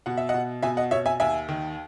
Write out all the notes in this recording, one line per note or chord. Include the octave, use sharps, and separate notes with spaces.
B2 F#5
E5
D#5 F#5
B2
B2 E5 G#5
D#5 F#5
B2 C#5 E5
E5 G#5
D#2 E5 G#5
D#3